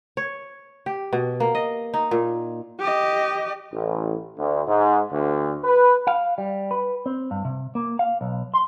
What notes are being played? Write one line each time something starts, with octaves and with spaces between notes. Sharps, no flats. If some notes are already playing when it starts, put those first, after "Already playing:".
C#5
G4
B2
A#3
D#5
D#4
A#2
G4 D#5
A1
D2
G#2
D2
B4
F5
G3
B4
C4
G2
C3
A#3
F5
B1
C6